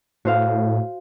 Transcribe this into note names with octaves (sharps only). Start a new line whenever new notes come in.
A2 F#4 C5 F5